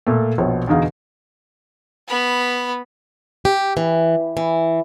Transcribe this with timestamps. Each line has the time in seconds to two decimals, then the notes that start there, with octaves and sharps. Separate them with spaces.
0.07 A#2 A3
0.38 A#1 B2 C#5
0.68 E2 B2 D3 D#4 G#4 F5
2.08 B3 B5
3.45 G4
3.77 E3
4.37 E3